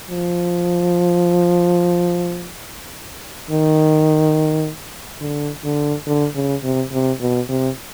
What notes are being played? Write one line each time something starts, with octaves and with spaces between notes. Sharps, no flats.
F3
D#3
D3
D3
D3
C#3
C3
C3
B2
C3